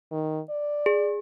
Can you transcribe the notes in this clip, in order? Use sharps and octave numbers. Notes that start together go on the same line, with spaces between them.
D#3
D5
G#4